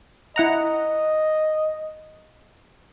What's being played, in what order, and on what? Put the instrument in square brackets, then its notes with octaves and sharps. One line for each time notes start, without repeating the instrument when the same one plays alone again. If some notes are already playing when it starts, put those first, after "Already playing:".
[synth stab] E4 F#5 A#5 [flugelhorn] D#5